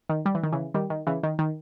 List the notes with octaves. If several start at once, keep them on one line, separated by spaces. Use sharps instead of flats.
D#3
G3
E3
D#3
C#3 E3
D#3 G3
D#3
C#3 E3
D#3
D#3